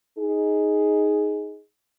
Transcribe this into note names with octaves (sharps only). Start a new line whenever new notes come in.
D#4 G#4